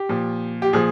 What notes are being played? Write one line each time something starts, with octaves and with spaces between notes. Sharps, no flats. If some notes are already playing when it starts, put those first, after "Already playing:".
Already playing: G4
A#2 F3
G4
A#2 F3 G#4